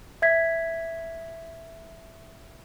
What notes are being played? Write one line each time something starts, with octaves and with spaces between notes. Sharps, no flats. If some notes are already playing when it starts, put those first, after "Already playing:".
E5 G#6 B6